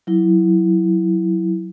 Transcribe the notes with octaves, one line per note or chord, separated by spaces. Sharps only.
F#3 E4